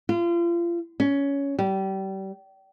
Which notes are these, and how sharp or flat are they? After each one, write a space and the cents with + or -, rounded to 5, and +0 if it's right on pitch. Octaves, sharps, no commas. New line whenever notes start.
F4 -35
C#4 +15
G3 -30